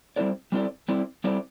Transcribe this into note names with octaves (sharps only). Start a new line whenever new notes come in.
G3 C4 E4 A4 D5
G3 C4 E4 A4 D5
G3 C4 E4 A4 D5
G3 C4 E4 A4 D5